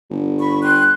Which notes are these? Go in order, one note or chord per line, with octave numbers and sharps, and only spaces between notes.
G1
B5 C#6
G5 C6 F#6